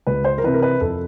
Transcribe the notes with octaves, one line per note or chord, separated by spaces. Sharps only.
C#2 B4
C5
A#4
C3 E3 B4
A#4
B4
F2 A4